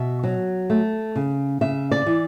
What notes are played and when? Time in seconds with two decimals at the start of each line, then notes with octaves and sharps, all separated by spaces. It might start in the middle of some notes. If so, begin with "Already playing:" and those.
Already playing: B2 E5
0.24 F#3
0.70 A3
1.16 C#3
1.61 C#3 E5
1.91 D5
2.06 E3